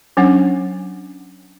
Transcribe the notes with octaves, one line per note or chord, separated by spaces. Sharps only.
F#3 C#4 D4 F#5